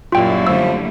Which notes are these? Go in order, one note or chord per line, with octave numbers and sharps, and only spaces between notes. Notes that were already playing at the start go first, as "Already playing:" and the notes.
F#2 A#2 G3 A#3 E4 F4 G5
D3 F3 G3 A3 E6